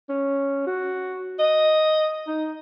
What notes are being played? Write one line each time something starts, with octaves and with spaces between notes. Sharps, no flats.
C#4
F#4
D#5
D#4